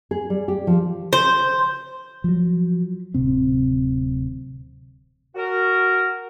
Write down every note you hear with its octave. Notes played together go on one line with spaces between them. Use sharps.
G#4
G3
G4
F3
C5
F3 F#3
D1 C3 C4
F#4 A#4